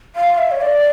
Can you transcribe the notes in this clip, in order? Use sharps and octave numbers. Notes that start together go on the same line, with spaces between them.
F5
E5
C#5
D5